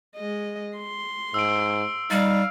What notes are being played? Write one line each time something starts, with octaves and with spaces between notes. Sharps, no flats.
G#3 D#5
C6
G#2 E6 D7
G3 D#4 F5